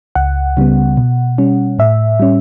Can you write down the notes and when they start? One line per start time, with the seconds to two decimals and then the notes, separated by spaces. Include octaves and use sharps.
0.15 C#2 F#5
0.57 C#3 G3 B3
0.97 B2
1.38 G3 C#4
1.79 A2 E5
2.20 G3 C#4